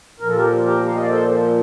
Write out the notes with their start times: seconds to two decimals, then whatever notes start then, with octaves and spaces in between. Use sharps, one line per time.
0.20 A#2 F3 A#4
0.29 A4
0.36 G4 A#4
0.65 G4 A#4
0.88 F5
0.95 D#5
1.03 D5
1.10 A4 C5